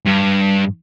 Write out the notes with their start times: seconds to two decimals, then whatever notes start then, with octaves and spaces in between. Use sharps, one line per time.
0.05 G2